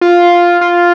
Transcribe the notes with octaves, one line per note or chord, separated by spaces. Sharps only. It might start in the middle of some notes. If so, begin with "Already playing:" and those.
F4
F4